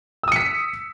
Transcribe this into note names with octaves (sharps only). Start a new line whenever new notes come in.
D#6 E6 B6 C#7